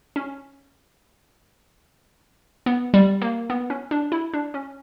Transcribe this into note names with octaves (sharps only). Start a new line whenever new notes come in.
C#4
B3
G3
A#3
B3
C#4
D4
E4
D4
C#4